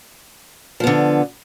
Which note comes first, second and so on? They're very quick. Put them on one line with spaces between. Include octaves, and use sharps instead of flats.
F3 B3 D3